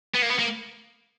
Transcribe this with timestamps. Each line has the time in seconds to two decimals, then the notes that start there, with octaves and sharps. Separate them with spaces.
0.15 B3
0.23 A#3
0.30 B3
0.39 A#3